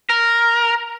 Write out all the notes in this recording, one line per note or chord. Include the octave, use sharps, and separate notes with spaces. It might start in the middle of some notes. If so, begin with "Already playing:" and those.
A#4